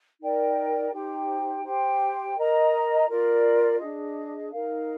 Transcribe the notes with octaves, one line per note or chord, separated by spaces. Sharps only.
D#4 A#4 D5 G5
D#4 G4 C5 G5
G4 C5 G5
A#4 D#5 A#5
F4 A#4 D5
D4 G#4 D#5
D#4 A#4 F5